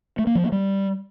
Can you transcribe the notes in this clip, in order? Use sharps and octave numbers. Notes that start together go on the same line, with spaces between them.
A3
A#3
F3
A#3
G3